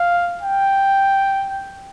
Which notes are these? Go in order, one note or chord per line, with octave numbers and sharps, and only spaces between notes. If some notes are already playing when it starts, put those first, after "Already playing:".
Already playing: F5
G5